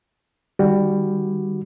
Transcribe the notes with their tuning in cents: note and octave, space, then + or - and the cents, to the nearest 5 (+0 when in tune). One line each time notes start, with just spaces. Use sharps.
D#3 -25 G3 +15 F#4 +0